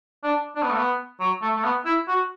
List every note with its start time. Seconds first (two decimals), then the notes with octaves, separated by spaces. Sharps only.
0.23 D4
0.56 D4
0.63 B3
0.70 A3
0.77 B3
1.20 F#3
1.42 A3
1.57 A3
1.64 B3
1.86 E4
2.08 F#4